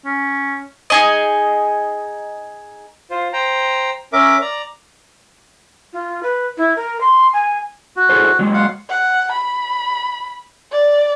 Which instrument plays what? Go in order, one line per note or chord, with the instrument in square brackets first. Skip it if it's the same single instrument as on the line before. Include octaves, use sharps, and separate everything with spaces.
[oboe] C#4
[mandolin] D#4 G#4 D#5
[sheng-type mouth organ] F4 C5
C5 G5 A#5
C#4 A#4 E5 D6
D5 A#5
[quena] F4
B4
E4
A#4
C6
G#5
[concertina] F#4
[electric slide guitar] G#4 A4 C5
F#3 G#3
[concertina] F5 F#5 C6
[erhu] F#5
B5
D5